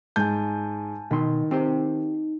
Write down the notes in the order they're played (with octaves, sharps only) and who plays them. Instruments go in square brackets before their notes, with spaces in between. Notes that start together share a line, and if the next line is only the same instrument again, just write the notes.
[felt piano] G#2 G6 [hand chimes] G#5 A5
[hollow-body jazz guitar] B2 C6 [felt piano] D#3
[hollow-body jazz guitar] C4 G4 C5 [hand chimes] D#4